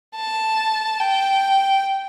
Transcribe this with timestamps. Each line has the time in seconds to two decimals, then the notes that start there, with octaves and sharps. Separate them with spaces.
0.15 A5
1.00 G5